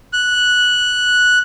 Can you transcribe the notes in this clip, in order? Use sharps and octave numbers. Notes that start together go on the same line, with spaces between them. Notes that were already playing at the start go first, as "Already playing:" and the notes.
F#6